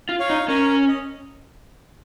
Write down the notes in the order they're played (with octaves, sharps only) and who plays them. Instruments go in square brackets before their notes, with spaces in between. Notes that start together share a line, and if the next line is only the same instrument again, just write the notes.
[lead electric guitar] F4
[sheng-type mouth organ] C#5 F5
[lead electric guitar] D#4
[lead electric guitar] C#4 [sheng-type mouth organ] A#4 C#5
[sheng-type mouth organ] D#5